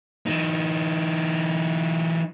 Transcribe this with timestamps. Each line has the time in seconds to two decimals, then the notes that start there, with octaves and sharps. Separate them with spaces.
0.27 E3 D#4